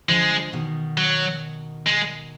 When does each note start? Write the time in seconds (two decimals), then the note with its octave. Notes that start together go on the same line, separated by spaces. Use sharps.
0.08 D3 F3 G#3
0.53 B2 D#3
0.97 F#3
1.86 G#3